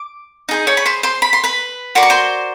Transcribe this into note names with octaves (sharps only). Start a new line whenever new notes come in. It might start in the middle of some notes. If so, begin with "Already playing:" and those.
Already playing: D6
D#4 G#4 C5
C#5 C#6
B5
C5 C6
C5 C6
B5
C6
B4 B5
F#4 A#4 D5 C6
C#6
C5 C6